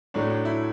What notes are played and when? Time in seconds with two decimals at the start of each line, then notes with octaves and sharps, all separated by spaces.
0.14 A2 F#3 A3 D4
0.30 D4
0.45 E4